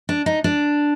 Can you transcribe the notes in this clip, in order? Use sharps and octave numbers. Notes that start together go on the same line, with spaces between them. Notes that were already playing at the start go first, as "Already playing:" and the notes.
D4
D#4
D4